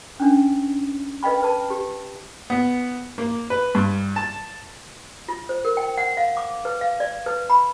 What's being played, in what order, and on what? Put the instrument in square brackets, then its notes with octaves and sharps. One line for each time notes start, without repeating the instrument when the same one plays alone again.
[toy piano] C#4 D4
B4 D#5 F5 G5 B5
B4 A5
G4
[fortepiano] B3
A#3
B4
G2
A5
[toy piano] F4
C5
A#4
G5
F#5
F5
D6
B4
F5
D5
B4
B5